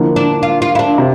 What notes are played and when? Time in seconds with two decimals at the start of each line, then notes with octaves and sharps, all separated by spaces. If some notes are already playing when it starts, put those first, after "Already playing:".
Already playing: D3 F3 A#3 E4
0.16 D4
0.43 F4
0.62 F4
0.75 E4
0.79 D4
0.98 C3